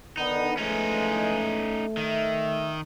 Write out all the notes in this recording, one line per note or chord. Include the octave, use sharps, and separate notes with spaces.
D3 D#3 B3 D#4
E3 F3 G#3 A3 C#4 D#4
D#3 E5